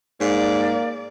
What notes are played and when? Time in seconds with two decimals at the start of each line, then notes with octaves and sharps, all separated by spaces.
0.21 G#2 A#3 D5